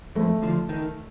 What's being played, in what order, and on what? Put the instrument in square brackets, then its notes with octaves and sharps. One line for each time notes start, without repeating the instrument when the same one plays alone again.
[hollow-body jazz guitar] F2 [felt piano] A3
[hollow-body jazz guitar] D3 F3
D#3